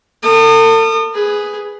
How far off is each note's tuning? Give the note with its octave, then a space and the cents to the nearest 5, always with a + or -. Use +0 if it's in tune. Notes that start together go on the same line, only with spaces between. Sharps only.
A4 +40 D#6 -35
G#4 +0 B4 +5